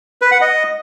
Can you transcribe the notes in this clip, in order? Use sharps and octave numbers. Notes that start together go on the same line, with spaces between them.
B4
F#5
D#5